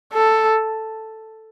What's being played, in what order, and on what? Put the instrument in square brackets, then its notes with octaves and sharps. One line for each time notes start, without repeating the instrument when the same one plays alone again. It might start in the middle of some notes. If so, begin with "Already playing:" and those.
[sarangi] A4